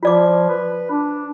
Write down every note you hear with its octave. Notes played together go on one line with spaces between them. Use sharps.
F3 F4 D5 D6
B4
D4